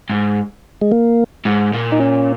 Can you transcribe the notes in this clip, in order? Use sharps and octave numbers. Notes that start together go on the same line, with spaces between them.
G#2
G#3
A#3
G#2
A#2
D#4
C#4